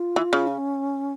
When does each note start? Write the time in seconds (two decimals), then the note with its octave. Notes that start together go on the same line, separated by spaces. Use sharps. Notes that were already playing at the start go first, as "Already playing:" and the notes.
Already playing: F4
0.16 E3
0.33 C#3
0.47 C#4